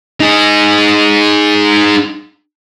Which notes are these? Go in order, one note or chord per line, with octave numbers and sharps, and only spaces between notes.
D#4 G#4